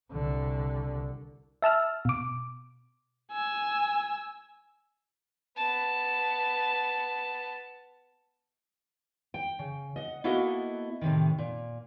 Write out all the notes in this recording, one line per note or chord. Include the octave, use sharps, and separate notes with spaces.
C2 D3
E5 A5 E6 F6
B2 D6
G#5 E6
B3 A5
G5
C#3
D#5 F#5
A#3 B3 E4 F#4 A4 D#5
A2 C3 D#3
A#2